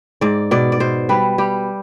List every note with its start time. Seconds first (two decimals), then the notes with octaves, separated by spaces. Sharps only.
0.21 G#2 D5
0.51 B2 D5
0.72 D5
0.80 B2 C5
1.09 G3 B4
1.38 G3 G4